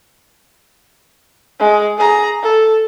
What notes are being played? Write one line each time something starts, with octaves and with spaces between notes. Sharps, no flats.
G#3
G#4 A#5
A4